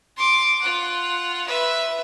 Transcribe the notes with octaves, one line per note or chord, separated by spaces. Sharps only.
C6 D6
F4 F#5
B4 E5